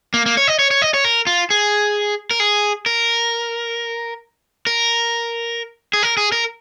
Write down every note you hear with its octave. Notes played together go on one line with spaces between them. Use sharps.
A#3
A#3
C#5
D#5
C#5
C#5
D#5
C#5
A#4
F4
G#4
A#4
G#4
A#4
A#4
G#4
A#4
G#4
A#4